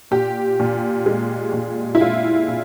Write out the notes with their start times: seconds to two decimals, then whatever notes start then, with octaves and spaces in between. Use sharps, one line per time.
0.11 A#2 G4
0.60 A#2
1.06 G#3
1.53 A#2
1.95 E4
2.01 G#3 F4
2.48 A#2